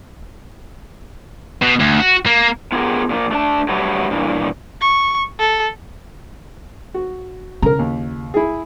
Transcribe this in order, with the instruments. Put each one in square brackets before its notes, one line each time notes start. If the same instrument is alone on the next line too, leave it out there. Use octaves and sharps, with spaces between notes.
[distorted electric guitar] B2
D2
F#4
A#3
[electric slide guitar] B3 F4 G4 G#4 A#4
A#2 D3 F3 A#3
A3 D4 A5
F#3 G3 A3 B4
G2 A#2 E3
[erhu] C#6
A4
[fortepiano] F#4
[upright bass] C#3 E4 [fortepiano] A#4 A#5
[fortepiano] D#2
E4 G#4